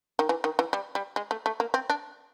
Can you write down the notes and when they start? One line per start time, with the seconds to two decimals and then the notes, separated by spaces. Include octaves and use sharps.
0.19 D#3
0.29 E3
0.44 D#3
0.59 E3
0.73 G3
0.95 G3
1.16 G#3
1.31 A3
1.46 A3
1.60 A#3
1.74 C4
1.90 D4